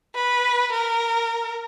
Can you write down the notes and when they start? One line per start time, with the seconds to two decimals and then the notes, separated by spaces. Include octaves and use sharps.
0.15 B4
0.72 A#4